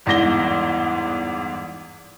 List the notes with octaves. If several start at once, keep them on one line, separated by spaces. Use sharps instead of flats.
G1 E2 G#2 A#6 G7